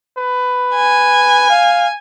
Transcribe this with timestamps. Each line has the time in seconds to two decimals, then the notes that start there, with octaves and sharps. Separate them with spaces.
0.18 B4
0.75 G#5
1.50 F5